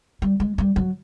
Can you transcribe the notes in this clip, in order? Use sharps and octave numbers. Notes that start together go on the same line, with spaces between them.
G3
G#3
G3
F#3